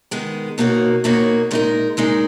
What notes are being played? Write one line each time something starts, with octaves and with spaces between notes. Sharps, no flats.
D#3 G#3 B3
B2 A#3 D#4 F#4 C#5
B2 A#3 D#4 F#4 C#5
A#2 G#3 D#4 A#4
A#2 G#3 D#4 A#4